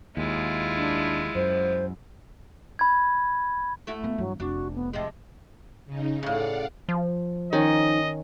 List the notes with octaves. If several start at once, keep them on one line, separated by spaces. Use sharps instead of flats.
D#2 G#3 E4 F4
D4
F#2 C5
B5 G#6
A3 E4 F#4
A#3 B3
G2 E3 F#3
F1 D4 E4 F#4
B3
C3 F3 G#3 D#5
C#3 D#4
A2 C#3 D5 F5 F#5
F3
D#3 C#4 D#4 D#5